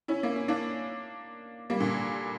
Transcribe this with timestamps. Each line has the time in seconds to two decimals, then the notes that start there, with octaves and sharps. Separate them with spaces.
0.08 C#4 E4
0.23 A#3
0.36 C#4
0.48 A#3 D4
1.70 G3 A#3
1.80 A#2 D3